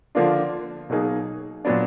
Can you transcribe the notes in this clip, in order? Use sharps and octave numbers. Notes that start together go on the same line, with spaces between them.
D3 F3 A#3 D4 F4
B2 F#3 A#3 D#4 G#4
A#2 F#3 B3 D4